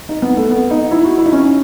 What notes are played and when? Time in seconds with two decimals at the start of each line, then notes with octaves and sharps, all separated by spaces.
0.09 D#4
0.22 B3
0.37 A3
0.50 B3
0.71 D#4
0.91 E4
1.04 F#4
1.18 E4
1.26 D#4
1.32 C#4